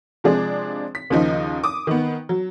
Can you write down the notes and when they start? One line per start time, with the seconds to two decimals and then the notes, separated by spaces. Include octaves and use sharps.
0.24 C3 F3 G#3 D4 G#4
0.95 B6
1.10 D#2 C#3 F3 D#4
1.64 D6 D#6
1.87 D#3 B3
2.29 F#3